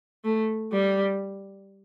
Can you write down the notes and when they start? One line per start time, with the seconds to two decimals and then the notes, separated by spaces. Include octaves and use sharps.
0.24 A3
0.72 G3